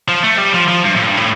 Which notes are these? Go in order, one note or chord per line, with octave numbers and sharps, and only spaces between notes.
F3
A3
G3
F3
F3
G2
A2
G2
A2